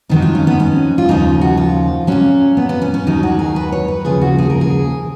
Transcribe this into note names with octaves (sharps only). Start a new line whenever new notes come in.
F2 D#3 F#3 D#4
F4
C#4
B3
C#4
F4
D#2 C#3 F3 D#4
F#4
F4
A#2 F#3 C#4
B3
B3
C#4
C#4
D#2 D#3 F#3 D#4
F#4
G#4
B4
C#5
B4
D#2 C#3 F3 G#4
F#4
G#4
A#4
G#4